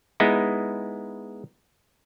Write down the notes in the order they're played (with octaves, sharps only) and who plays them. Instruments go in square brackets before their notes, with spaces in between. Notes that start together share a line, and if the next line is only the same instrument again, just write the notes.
[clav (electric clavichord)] G#3 B3 D#4 E4